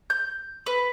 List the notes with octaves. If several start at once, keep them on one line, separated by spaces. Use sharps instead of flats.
G6
B4